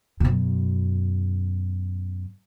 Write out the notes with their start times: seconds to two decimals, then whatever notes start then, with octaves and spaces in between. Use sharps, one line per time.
0.20 F#2 B2